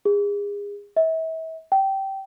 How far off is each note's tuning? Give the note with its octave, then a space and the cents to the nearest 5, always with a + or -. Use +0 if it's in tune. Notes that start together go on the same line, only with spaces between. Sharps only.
G#4 -35
E5 -35
G5 -15